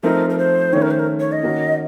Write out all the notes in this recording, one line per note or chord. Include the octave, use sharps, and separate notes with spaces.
F3 A3 C4 D#4 A#4
A#4
C5
D#3 A3 C#4 C#5
A#4
C5
A#4
C#5
D#5
D#3 A#3 C#4 F#4